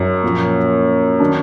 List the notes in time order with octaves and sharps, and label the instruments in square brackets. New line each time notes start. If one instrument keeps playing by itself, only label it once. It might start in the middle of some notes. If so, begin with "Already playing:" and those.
Already playing: [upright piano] F#2 [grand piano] D#4
[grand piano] A#2 F3 A#3
D#3 F#3 D4